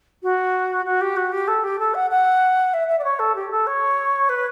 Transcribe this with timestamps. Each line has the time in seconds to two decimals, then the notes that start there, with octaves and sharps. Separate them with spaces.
0.23 F#4
0.85 F#4
1.01 G4
1.16 F#4
1.32 G4
1.48 A4
1.64 G4
1.79 A4
1.94 F#5
2.10 F#5
2.74 E5
2.88 E5
2.99 D5
3.04 C#5
3.19 A4
3.35 G4
3.51 A4
3.67 C#5
4.29 B4